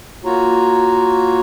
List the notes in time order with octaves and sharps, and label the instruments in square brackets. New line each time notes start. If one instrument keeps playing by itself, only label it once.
[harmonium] A#3 F4 F#4 C#5 A#5